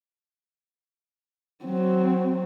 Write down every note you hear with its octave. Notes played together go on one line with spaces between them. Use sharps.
F#3 C4